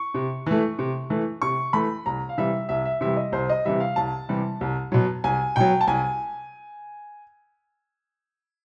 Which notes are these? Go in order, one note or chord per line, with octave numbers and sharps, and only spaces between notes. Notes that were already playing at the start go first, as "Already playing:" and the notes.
Already playing: C#6
C3
E3 A3
C3
E3 A3
C3 C#6
E3 A3 B5
C2 A#5
F5
C3 E3 G3 E5
C2 E5
E5
C3 E3 G3 E5
D#5
C2 C5
D#5
C3 E3 G3 E5
F5
C2 A5
C3 E3 G3
C2
B2 F#3
C2 G#5
B2 F#3 G5
A5
C2 G#5